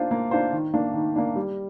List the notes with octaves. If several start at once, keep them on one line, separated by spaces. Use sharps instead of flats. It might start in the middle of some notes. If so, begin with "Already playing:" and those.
Already playing: A#3 D4 F4 C5
A#3
D4 F4 C5
D#3
A#3 D4
D#3
A#3 D4
G3